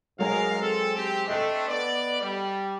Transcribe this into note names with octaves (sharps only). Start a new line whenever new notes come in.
G#2 F#3 G#3 A#4 F5 G#5
C4 A4
C4 G4
A3 C4 D4 A4 D#5
B3 D5
G3